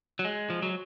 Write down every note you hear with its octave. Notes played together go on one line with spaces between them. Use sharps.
F#3
G#3
F3
F#3